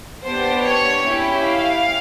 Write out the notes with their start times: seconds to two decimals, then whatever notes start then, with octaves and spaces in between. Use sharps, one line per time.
0.24 B3 D4 G4 C5
0.64 C#5
1.03 C#4 E4 G4
1.42 F5